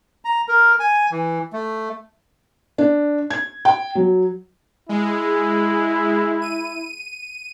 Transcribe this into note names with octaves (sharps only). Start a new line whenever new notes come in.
A#5
A#4
G#5
E3
A3
D4
G#6
G5
F#3
G#3 E4
D#7